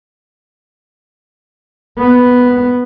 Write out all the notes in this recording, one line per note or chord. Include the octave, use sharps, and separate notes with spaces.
B3